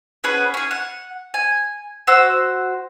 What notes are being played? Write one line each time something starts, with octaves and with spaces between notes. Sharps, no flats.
B3 C#4 G#4 B4
C#4 G#4
F#5
G#5
F#4 C5 E6